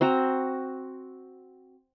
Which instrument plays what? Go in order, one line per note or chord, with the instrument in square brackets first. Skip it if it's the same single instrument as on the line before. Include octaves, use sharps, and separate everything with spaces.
[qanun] C4 F#4 A#5